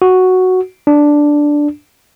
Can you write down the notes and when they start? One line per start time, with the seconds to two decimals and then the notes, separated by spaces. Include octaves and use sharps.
0.02 F#4
0.87 D4